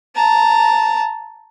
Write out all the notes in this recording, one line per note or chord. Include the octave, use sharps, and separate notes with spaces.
A5 A#5